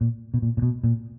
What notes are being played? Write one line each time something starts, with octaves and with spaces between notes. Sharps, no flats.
A#2
B2
A#2
A#2
B2
A#2